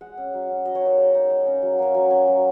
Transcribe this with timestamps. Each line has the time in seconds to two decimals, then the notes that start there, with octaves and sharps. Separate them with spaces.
0.01 G#3 F#5
0.18 C#4
0.34 F#3
0.49 C#4
0.65 F#3 D#5
0.75 C#5
0.82 A#3 D#4 D#5
0.97 G#3
1.14 D#4
1.30 G#3
1.46 C#4
1.62 F#3
1.79 A#3 C#4
1.94 F#3
2.11 C#4
2.27 F#3